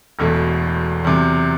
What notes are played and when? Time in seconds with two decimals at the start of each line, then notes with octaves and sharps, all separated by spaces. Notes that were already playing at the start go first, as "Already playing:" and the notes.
0.19 E1 E2 B2 A3
1.05 E2 C3 F#3